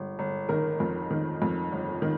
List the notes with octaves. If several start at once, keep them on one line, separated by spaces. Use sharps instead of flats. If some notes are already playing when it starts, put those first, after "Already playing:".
Already playing: G1
G1
D#3 A#4
F2
D#3
F2
G1
D#3